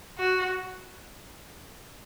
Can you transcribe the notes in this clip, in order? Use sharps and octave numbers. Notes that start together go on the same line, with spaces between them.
F#4